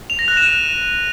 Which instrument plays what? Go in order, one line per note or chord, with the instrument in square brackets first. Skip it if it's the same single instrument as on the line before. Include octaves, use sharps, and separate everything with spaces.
[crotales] F7
A#6
F#6
E7
D#7